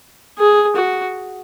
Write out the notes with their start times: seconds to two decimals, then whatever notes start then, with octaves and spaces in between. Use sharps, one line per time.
0.39 G#4
0.76 F#4